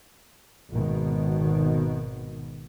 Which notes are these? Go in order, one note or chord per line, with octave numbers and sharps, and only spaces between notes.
G#1 B2 D#3